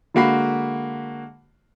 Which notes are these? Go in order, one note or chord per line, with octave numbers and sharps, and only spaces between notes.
D3 G#3 A#3 F#4 B5 C7